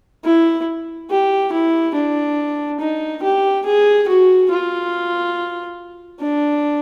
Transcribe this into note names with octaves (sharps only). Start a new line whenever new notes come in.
E4
G4
E4
D4
D#4
G4
G#4
F#4
F4
D4